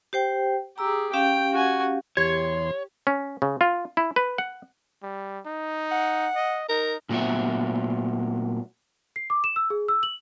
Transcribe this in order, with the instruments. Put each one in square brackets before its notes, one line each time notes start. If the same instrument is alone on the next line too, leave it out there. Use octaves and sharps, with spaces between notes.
[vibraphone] G4 C5 G5
[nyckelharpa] G4 G#4 [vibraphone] A#5 E6
[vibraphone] C#4 G4 F5 [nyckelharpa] G5
[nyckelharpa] F#4 G#5
[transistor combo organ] E2 C6 [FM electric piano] G4 [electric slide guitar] C#5 [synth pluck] G#6
[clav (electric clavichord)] C#4
C#3
F4
E4
B4
F#5
[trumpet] G3
D#4
[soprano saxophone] F#5
[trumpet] D#5
[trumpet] D#4 [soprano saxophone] A#4
[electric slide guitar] A#2 F#3 A3 B3 E5
[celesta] C7
D6
E7
E6
G#4
E6
F#7